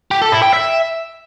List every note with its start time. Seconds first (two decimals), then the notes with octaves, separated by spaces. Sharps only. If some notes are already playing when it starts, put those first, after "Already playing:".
0.11 G4
0.22 A4
0.32 E4
0.43 G5
0.53 E5